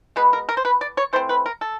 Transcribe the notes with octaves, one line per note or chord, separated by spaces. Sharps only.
B2 G#3 B3 B4
A#4
A#4
C5
B4
D5
C#5
E3 A3 C4 C5
B4
A#4
A4